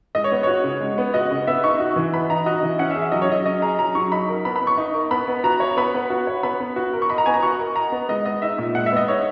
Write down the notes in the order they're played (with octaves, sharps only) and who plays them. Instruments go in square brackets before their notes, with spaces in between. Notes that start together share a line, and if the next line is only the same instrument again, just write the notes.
[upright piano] G#3 [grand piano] D#5
[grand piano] C#5
[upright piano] B3
[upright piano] F#4 [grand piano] C#5
[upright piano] C#3
G#3
B3
[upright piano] F#4 [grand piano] D#5
[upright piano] C#3
[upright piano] B3 [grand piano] E5
[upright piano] D#4 [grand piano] C#6
[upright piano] F#4
E3
[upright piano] B3 [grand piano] B5
[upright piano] D#4 [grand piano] A#5
[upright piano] F#4 [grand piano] D#5
[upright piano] E3
[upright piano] C#4 [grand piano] F#5
[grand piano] E5
[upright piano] G#4
[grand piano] E5
[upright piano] F#3 [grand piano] D#5
[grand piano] C#5
[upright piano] F#3 [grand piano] D#5
[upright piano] C#4 [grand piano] D#5
[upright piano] G#4 [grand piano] A#5
[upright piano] F#3 [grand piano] A#5
[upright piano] F#3 [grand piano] C#6
[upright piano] D#4 [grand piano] B5
[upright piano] A#4
[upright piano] B3 [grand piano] B5
[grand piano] B5
[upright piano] B3
[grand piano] C#6
[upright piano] D#4
A#4
[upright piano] B3 [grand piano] B5
[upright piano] B3
[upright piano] F#4 [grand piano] A#5
[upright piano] C#5
[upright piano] B3 [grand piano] B5
[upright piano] B3
F#4
C#5
[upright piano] B3 [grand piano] B5
[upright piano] B3
F#4
A#4
[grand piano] C#6
[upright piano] D#5 [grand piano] B5
[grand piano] A#5
[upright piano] B3 [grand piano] G#5
[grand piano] A#5
[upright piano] F#4 [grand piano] C#6
[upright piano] A#4
[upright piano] D#5 [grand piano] A#5
[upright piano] B3
[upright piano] G#3 [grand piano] D#5
[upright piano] B3 [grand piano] D#5
[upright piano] D#4 [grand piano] E5
[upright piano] A#2
[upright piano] G#3 [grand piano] F#5
[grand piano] E5
[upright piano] B3 [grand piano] D#5
[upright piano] D#4 [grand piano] C#5